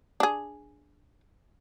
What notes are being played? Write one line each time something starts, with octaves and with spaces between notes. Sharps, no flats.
D4 G#4